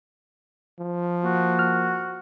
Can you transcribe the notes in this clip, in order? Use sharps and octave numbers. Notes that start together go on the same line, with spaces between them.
F3
A#3 F#4
F6